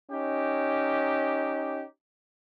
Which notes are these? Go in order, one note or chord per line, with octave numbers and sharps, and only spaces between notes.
C#4 D#4 G4